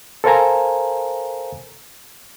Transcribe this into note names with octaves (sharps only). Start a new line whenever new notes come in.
A4 A#4 C5 F5 G#5 A#5